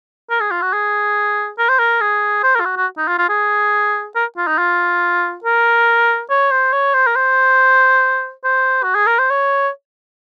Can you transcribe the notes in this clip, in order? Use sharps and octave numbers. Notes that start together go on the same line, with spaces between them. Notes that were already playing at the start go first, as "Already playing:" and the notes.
A#4
G#4
F4
F#4
G#4
A#4
C5
A#4
G#4
C5
A#4
F4
F#4
F#4
D#4
F4
F4
G#4
A#4
F4
D#4
F4
A#4
C#5
C5
C#5
C5
A#4
C5
C5
F#4
G#4
A#4
C5
C#5